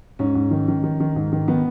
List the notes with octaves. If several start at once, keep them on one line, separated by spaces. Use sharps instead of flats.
G#2 C#4
G#2
D#3
D#3
D#3
D#3
G#2
D#3
D#3 B3